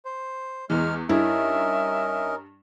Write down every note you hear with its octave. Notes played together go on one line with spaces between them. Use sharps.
C5
E2 E3 G#3 F6
G2 C#4 D#4 E4 A#4 E5